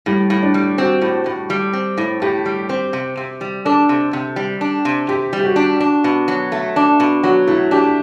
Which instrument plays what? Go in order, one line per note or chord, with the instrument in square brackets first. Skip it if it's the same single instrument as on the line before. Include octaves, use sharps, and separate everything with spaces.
[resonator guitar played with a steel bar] A2 [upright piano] G3
[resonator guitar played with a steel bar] A2
[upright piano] D4
[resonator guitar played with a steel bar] G3
[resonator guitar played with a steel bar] C4 [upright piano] F#4
[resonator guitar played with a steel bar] A2
A2
G3
C4
A2
[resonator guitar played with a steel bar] A2 [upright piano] G4
[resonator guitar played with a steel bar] G3
C4
C3
C3
G3
[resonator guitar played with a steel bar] D4 [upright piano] A4
[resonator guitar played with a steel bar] C3
C3
G3
D4
C3
[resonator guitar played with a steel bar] C3 [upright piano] G4
[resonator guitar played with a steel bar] G3
[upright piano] G4
F#4
[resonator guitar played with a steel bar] D4
D4
B2
F#3
A3
D4
B2
[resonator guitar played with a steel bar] F#3 [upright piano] F#4
[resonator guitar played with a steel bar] A3 [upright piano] E4
[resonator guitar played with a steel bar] D4 [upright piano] G4